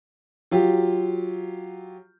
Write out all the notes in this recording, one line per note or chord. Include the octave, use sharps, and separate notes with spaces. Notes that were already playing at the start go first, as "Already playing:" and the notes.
F#3 F4 G4